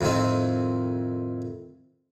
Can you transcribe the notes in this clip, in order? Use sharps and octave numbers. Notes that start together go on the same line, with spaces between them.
F2 A2 D#3 C4